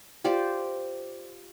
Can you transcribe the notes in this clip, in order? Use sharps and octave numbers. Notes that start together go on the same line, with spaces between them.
F4 G4 C5 D5